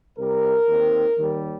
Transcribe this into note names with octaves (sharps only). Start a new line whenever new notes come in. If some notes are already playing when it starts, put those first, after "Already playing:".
C2 C3 G3 A#4
D#2 D#3 C4
D#2 D#3 G3